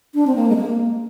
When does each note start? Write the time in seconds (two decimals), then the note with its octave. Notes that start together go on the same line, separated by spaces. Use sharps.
0.15 D4
0.27 C4
0.36 A#3
0.49 G#3
0.56 A#3